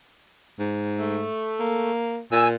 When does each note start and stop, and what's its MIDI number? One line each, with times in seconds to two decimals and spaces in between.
0.59 1.27 44
0.99 1.91 57
1.60 2.21 58
2.32 2.56 46
2.32 2.48 80
2.32 2.48 88